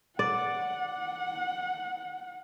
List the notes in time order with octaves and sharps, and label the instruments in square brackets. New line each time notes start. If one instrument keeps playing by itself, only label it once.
[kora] D5 [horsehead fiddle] F#5